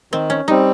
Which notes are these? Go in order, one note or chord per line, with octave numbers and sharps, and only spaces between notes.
D#3 C4
C#4
G3 C4 D#4